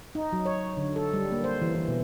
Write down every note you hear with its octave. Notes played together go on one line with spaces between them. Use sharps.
D#4
F#3
C#5
D3
A4
G3
A#3
C5
E3
E3
B2